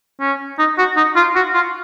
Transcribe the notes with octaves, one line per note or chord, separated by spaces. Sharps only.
C#4
D#4
F#4
D#4
F4
F#4
F4